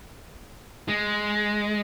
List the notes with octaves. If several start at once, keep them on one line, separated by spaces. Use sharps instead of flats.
G#3